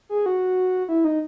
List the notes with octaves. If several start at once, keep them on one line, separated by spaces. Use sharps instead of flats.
G#4
F#4
E4
D#4